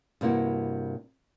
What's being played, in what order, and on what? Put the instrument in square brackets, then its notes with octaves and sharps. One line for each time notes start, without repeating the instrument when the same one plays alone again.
[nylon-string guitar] G2 C3 A#3 E4 F#4